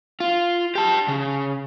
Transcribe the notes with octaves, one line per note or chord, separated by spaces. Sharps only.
F4
G4 A5
C#3